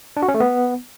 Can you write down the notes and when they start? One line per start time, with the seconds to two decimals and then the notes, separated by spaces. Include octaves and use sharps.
0.17 D4
0.23 F#4
0.28 C#4
0.34 A3
0.40 B3